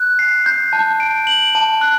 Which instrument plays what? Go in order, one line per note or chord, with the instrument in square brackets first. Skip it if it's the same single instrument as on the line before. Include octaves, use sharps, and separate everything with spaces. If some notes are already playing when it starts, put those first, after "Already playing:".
Already playing: [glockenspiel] F#6
C7
G6
A5
D7
F#7
A5
F#6